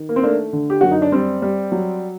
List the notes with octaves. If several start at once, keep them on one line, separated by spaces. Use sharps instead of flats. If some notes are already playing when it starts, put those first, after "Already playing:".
Already playing: D#3
A#3
C4
A3 A#3 D4
D3
G4
F#2 F#4
D#4
D4
G3 C4
G3
F#3